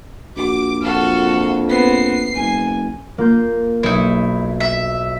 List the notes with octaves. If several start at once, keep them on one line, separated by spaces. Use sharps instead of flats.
A#1 F#4 D6
F2 F#4 A4 F5
B3 C4 C7
F#1 G#5
A#3 F4 G6
B1 D#4 E4
E5